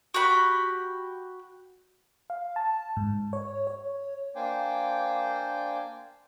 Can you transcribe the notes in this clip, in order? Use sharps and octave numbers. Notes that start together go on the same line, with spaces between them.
F#4 G4 B5
F5
A5
G#2
C#5
C#5
A#3 D4 C5 G5 G#5 D6